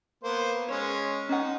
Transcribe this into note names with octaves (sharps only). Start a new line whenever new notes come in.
A#3 B3 C5
G#3 C#4 C#5
C#4 D#4 F#5